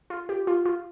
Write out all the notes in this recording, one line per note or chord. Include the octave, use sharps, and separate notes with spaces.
F4
G4
F4
F4